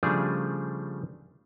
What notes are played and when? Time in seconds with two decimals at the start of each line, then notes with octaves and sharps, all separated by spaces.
0.03 C#3 F3 G3 A3 D4 G#4